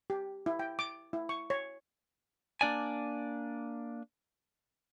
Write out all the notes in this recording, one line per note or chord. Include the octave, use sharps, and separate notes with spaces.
G4
E4
G5
D6
E4
C#6
C#5
A#3 D4 D5 G#5